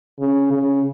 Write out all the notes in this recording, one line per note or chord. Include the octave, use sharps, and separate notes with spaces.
C#3
C#3